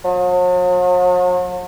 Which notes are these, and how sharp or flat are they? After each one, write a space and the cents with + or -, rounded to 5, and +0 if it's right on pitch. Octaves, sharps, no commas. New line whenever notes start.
F#3 -45